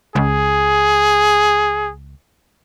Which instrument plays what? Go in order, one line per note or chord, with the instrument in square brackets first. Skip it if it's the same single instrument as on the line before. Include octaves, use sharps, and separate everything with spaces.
[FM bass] C#2 [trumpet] G#4